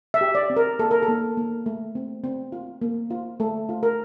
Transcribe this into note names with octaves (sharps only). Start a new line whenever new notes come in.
E5
G4
D5
C4
A#4
A#3 A4
A#4
A4
A#3
A#3
A3
C4
C4
F4
A#3
F4
A3 A4
F4
A#4